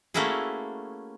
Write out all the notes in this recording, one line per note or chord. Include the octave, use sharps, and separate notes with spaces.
A3 A#3 C#4 E4 F#4 G#4